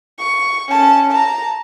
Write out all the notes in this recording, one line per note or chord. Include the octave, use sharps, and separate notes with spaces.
C#6
C#4 A5
A5 A#5